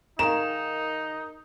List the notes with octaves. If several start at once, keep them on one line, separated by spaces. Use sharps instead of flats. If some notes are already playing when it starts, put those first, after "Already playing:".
D#3 D#4 G#4 A#4 F5 E7